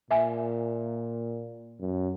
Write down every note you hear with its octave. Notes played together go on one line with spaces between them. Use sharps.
A#2 E5 G#5
F#2